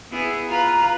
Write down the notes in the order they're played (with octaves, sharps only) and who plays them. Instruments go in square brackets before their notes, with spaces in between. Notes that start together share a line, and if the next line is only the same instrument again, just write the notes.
[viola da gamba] B3 E4 G#4
[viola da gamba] F4 B4 [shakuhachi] A#5